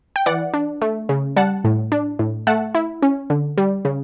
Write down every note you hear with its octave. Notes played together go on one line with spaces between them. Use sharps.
G5
E3 D5 F#5
D4
A3
C#3
G3 F#5 A5
A2
D4
A2
A3 F#5 A5
E4
C#4
D3
G3
C#3